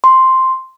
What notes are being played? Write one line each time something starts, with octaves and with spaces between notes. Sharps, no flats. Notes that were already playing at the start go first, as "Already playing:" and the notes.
C6